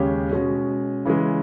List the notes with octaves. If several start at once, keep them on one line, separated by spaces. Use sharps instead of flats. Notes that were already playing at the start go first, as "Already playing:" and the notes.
Already playing: D#2 C#3 G#3 C#4 G4
B2 G#3 C#4
C#3 E3 G#3